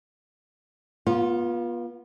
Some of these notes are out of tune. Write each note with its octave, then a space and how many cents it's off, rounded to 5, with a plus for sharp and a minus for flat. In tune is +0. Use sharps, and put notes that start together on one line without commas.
B3 -35 F4 +5